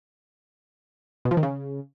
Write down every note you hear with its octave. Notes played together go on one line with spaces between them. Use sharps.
B2
F3
D#3
C#3